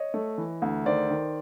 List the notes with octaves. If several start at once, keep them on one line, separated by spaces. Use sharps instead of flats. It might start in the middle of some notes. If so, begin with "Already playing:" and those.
Already playing: C#5 D#5
A3
E3
D2
D#3 C5 D5
D#3